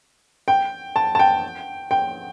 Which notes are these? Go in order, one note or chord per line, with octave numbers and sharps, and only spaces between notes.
G5
A5
A5
G5
G5